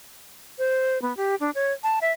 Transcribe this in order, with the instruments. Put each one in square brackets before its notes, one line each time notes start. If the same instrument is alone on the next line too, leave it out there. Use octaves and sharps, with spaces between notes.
[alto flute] C5
B3
G4
D4
C#5
A5
E5